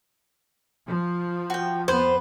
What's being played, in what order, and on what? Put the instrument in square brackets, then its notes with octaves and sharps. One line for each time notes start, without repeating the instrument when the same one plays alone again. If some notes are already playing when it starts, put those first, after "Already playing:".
[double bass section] F3
[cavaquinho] F#4 G5
[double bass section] F2 B3 [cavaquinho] B4 [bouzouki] C5